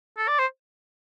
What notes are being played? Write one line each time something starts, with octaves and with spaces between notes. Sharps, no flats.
A4
D5
C5